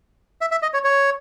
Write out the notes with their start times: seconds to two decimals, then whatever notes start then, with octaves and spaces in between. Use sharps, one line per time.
0.41 E5
0.51 E5
0.62 D#5
0.74 C#5
0.84 C#5